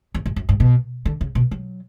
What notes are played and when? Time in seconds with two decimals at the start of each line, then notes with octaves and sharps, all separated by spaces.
0.14 E2
0.26 F#2
0.36 F#2
0.49 G2
0.60 B2
1.05 D3
1.21 C#3
1.35 B2
1.51 F#3